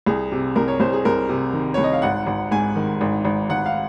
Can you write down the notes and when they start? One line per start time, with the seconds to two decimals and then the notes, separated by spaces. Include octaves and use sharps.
0.06 C2 G#4
0.32 C3
0.56 C2 A#4
0.68 C#5
0.80 C2 C5
0.93 G#4
1.05 C2 A#4
1.29 C3
1.53 D#3
1.74 C2 C#5
1.83 D#5
1.93 F5
2.02 G#1 F#5
2.27 G#1
2.51 G#2 G#5
2.76 D#3
3.01 G#1
3.25 G#1
3.50 G#1 F#5
3.66 F5